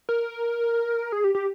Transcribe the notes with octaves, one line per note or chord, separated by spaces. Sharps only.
A#4
G#4
G4
G4